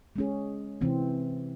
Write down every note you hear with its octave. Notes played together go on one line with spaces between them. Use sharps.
G#3 C#4 G#4
C3 E3 C4